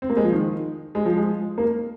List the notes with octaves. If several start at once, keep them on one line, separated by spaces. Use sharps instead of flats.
C4
A#3
G#3
F3
D#3
G#3
F3
G#3
A#3